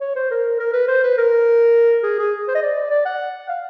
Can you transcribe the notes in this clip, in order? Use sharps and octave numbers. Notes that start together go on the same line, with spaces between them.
C#5
C5
A#4
A#4
B4
C5
B4
A#4
G#4
G#4
C5
D#5
D5
D5
F#5
F5